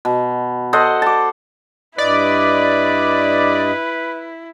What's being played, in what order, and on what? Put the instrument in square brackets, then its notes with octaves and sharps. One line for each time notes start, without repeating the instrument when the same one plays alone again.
[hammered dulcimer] B2
A4 C5 D#5 F#5
A5 D6
[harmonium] G2 D#5 [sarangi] E4 [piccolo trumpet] B4 [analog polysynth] D5